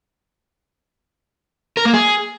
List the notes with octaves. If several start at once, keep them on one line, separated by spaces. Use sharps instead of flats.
A#4
A#3
G#4